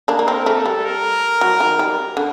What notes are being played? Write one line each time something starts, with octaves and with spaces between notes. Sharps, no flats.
A#3 D4
A#3
C4 A#4
A3
A4
G3
A#4
F#3
D#3
G3
D3